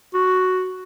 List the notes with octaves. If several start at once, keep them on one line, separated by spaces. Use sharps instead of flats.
F#4